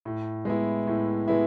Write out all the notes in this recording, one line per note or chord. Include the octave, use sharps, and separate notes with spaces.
A2
G#3 B3 E4
A2
G#3 B3 E4